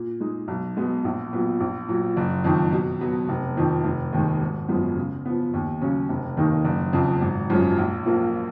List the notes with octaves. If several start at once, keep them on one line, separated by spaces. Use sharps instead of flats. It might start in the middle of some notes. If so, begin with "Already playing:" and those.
Already playing: A#2
G#3 D#4
B1
B2 G#3 B3
A#1
A#2 F#3 B3
A#1
A#2 F#3
F#1
F2 D#3
B2
F#3 B3
F1
F2 D#3
F1
D#2 D#3 G#3
G#1
F#2 F3 G#3 B3
C#3
F3 B3
D#2
C#3 F#3 C#4
F1
D#2 D#3 A#3 D#4
F#1
F2 C#3
G#1
F#2 F3 G#3 C#4
A#1
A#2 F3 A#3